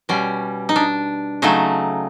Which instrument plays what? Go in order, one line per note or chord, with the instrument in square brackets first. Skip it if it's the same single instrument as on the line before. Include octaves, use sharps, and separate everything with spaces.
[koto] B2 G3 C#4
D#4
D4
C#3 F#3 A3 D#4